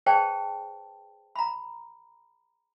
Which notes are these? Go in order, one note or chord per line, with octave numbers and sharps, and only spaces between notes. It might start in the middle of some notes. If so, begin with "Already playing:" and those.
G#4 B4 C5 D5 G5 A5
A#5 B5